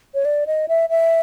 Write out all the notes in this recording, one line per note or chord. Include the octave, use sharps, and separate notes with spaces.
C#5
D5
D#5
E5
E5